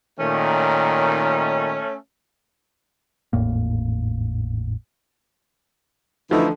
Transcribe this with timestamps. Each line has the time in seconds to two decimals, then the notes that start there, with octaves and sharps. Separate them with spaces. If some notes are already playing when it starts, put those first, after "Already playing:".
0.20 A#2 D#3 A3 C#4
3.33 G#1 E2 A2 A#3
6.31 D3 E3 F3 A3 D#4